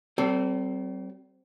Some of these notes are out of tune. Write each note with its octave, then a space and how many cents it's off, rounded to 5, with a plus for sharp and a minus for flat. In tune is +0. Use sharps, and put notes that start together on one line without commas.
G3 -40 C4 +0 A4 +20